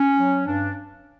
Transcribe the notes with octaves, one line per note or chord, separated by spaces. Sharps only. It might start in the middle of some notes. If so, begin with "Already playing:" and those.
Already playing: C#4
F#3
G2 D4